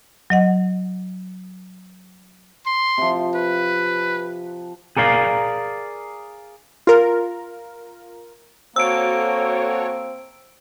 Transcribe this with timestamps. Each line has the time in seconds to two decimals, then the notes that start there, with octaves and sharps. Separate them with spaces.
0.30 F#3 D#5 F#5
2.66 C6
2.98 C3 F3
3.35 B4
4.97 G#4 A#4 D5 F5
6.87 F4 A#4
8.76 A#3 C4 F#4 A4 C#5 E6 D7